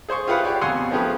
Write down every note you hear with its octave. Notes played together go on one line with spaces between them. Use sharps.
G#4 C5 C6 C#6
E4 F4 G4 G#4 B4 F#5
G4 C#5 D5
F2 B2 F#5 G#5 C6 C#6
F3 A3 C#4 G4 G#4 B4